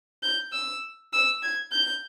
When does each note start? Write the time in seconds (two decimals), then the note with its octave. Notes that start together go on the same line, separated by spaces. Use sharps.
0.23 G6
0.53 E6
1.13 E6
1.43 G#6
1.72 G6